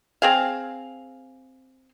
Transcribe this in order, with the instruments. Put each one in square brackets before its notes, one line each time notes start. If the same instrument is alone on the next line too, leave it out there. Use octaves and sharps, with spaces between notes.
[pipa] C4 G#4 F5